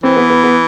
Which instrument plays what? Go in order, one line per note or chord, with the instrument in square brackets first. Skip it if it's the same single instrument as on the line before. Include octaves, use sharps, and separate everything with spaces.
[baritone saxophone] E3 [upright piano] C4
[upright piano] B3
B3
B3